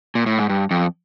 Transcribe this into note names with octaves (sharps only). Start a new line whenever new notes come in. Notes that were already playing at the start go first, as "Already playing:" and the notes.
A#2
A2
G#2
G2
F2